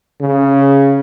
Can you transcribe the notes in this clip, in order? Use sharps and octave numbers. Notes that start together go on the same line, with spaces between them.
C#3